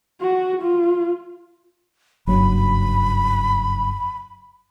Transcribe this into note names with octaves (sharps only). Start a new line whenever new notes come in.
F#4
F4
F#1 G2 F#3 B5